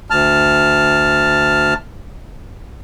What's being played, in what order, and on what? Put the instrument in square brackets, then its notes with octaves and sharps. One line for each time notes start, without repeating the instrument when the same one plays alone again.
[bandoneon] D2 A5 F6